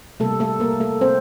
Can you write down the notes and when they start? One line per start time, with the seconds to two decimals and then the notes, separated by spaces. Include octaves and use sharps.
0.20 C3 G3 A3 A#3 A4
0.40 A3 A4
0.60 A#3 A#4
0.80 A3 A4
1.01 C4 C5